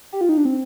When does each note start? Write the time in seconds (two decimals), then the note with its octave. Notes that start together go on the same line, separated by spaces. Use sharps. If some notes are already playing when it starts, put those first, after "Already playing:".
0.13 G4
0.21 F4
0.29 D#4
0.37 D4
0.45 C4